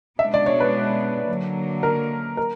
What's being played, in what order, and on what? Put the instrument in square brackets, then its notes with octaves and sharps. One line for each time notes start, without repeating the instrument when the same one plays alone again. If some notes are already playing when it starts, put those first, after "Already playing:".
[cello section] B2 G#3 B3 D4 [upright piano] E5
[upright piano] D5
C#5
B4
[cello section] D3 F#3 A#3
[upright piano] A#4
A#4